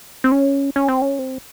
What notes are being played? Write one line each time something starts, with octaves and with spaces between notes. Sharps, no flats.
C4
C#4
C#4
C4
C#4
C4